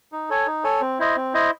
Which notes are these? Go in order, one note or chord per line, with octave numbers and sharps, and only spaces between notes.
D#4
A4 C#5 G#5
D#4
A4 C#5 G#5
C4
E4 C5 D#5
C4
E4 C5 D#5